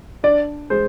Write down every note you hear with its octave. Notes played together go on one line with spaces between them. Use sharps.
D4 D5
G#3 C5